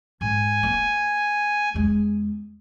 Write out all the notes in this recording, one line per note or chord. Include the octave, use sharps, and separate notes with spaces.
G#2 G#5
A#3
E2 G#3